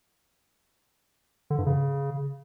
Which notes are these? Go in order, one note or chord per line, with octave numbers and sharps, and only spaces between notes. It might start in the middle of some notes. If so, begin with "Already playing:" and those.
D3
G2
C#3